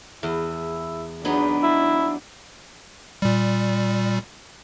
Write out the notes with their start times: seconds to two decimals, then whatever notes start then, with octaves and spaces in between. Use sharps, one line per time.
0.23 E2 E4
1.25 E2 F#3 B3 D4 D#4
1.63 E4
3.22 A#2 G3